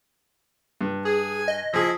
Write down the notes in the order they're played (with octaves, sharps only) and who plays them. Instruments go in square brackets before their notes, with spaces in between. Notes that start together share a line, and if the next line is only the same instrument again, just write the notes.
[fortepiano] G2
[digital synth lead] G#4 [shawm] G#5
[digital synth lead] D#5
[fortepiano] F3 G#4 [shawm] E4